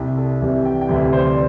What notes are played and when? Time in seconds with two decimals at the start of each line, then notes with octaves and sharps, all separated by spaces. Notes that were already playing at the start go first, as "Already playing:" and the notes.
Already playing: C2 C3 G3 G4
0.17 A4
0.41 C2 C3 E3 G3
0.65 G5
0.81 G5
0.89 D2 C3 E3 G3 E5
1.02 D5
1.13 C5
1.25 D5